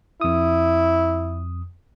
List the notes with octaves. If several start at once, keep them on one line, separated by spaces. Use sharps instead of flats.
F2 E4 D#6